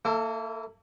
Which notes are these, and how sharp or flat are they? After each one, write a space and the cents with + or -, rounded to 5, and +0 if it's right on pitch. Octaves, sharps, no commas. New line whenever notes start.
A#3 -30 E4 -10 A4 +15